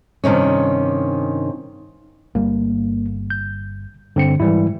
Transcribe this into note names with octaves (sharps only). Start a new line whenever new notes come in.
G2 C3 D#3 C#4
G1 G3 A#3
G6
G2 D3 C4 C#7
G#2 E3 G3 E4